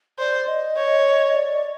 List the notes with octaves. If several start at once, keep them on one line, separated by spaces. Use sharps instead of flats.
C5 D5
D#5
C#5
D5